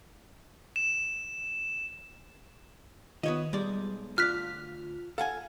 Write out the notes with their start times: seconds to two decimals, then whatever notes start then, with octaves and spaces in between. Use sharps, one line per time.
0.76 E7
3.23 D#3 B3 F4 C#5 D#5
3.53 B1 G3 G#3 D5
4.18 D2 F4 D5 F6 F#6 B6
5.18 A4 F5 F#5 G#5